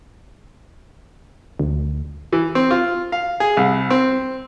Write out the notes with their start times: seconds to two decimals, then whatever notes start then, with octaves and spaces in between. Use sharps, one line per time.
1.59 D2
2.33 E3
2.55 C4
2.71 F4
3.12 F5
3.40 G#4
3.57 C2
3.90 C4